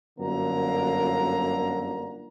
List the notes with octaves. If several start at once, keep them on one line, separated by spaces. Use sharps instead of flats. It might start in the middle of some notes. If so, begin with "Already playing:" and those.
G1 F#2 D3 A#3 A#5